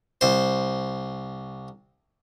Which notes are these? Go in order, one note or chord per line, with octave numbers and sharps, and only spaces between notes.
C2 C5